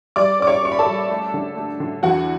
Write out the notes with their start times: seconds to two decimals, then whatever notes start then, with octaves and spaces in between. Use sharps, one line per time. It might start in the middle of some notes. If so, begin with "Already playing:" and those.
0.16 G3 D5 D6
0.40 C#4 D6
0.47 C#5 C#6
0.63 C#4 C#6
0.72 B5
0.79 A4 A5
0.86 G3
1.10 A3
1.34 D3
1.56 A3
1.80 D3
2.03 E2 F#4 F#5